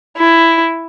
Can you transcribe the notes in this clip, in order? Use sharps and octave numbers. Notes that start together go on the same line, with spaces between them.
E4